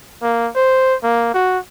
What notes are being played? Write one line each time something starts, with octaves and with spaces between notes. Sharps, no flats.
A#3
C5
A#3
F#4